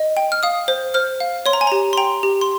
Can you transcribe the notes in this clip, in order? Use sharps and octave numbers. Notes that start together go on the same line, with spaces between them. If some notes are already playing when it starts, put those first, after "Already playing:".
Already playing: D#5
G5
F6
F5 D#6
C5
C5 F6
F5
C#5 C6
A#5
G#5
G4 A#5
C6
G5 A#5
G4
C6